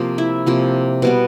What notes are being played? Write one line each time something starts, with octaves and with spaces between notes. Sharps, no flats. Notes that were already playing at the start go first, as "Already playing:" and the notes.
Already playing: C3 F3 A#3
E4 E5
C3 F3 A#3
B2 G3 B3